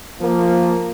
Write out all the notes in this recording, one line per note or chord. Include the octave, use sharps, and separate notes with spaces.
F3 A#3